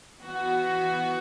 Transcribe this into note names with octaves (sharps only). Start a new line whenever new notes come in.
E3 B3 F#4